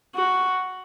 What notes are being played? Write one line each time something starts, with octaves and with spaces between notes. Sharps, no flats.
F#4